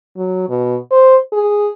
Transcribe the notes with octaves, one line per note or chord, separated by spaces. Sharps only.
F#3
B2
C5
G#4